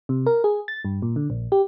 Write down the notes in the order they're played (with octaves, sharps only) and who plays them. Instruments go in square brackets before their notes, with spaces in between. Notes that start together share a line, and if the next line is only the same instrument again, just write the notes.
[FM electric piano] C3
A#4
G#4
A6
G2
A#2
D3
A#1
G4